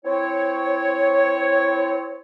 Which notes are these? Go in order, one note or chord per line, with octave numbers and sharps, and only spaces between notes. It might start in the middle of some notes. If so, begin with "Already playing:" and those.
C4 E4 C#5